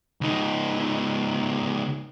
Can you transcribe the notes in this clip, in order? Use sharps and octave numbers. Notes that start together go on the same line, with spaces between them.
C#2 D#4